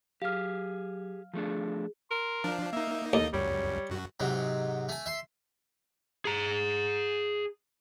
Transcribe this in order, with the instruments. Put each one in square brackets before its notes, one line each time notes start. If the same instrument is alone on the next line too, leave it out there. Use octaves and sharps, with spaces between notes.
[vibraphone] F#3 [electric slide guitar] G4 G#4 [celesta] F5 F6
[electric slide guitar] F3 A3 D4 [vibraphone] G#4
[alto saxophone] A#4 [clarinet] C6
[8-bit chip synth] F3 D4 [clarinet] F5
[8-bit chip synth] A#3 D#4 [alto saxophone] E5
[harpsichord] D#2 [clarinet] A4 [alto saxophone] D#5
[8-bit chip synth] C#2 F#2 [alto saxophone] G3 [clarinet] C#5
[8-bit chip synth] F#2 F#4
[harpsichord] G#2 C3 F#3
A3 G#5
E5 C6
[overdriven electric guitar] G#4 A#5